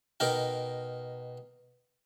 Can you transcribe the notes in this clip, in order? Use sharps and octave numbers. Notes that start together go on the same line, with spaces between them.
B2 D#4 A#4 G5